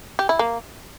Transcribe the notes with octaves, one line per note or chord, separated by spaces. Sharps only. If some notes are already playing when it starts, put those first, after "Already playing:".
G4
E4
A#3